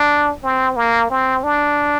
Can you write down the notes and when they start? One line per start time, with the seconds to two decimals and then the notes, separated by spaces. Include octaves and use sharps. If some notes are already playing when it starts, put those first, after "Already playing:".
Already playing: D4
0.43 C4
0.76 A#3
1.10 C4
1.43 D4